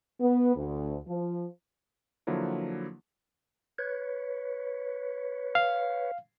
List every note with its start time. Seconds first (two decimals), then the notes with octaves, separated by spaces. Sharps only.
0.20 B3
0.55 D2
1.07 F3
2.27 D3 F3 F#3 A#3 E4
3.78 B4 C#5
5.55 F5